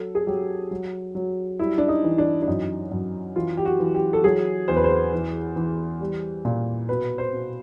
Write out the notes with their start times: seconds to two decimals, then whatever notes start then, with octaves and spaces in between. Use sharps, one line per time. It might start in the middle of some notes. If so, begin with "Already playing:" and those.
Already playing: F#3 A4
0.15 G#4
0.27 F#3 G4
0.71 F#3
1.15 F#3
1.59 G3 E4
1.78 D4
1.88 D#4
2.04 E3
2.18 D4
2.42 D4
2.47 F#2 D#4
2.92 F#2
3.36 E3 F4
3.57 G4
3.65 F#4
3.80 E3
3.95 G4
4.13 A4
4.24 F#3 G#4
4.68 E2 C5
4.76 B4
4.84 C5
5.13 E3
5.56 E3
6.01 G3
6.45 A#2
6.89 B2 B4
7.18 C5
7.33 B2